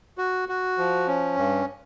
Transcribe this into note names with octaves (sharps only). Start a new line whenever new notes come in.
F#4
F#4
F3
C#4
G2